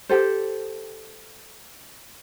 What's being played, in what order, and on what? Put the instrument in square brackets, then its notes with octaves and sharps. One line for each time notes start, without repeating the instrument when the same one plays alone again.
[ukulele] G4 A4 C5